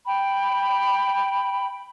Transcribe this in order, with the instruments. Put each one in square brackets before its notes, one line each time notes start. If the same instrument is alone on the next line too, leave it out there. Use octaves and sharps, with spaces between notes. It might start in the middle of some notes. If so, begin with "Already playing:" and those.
[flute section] G5 B5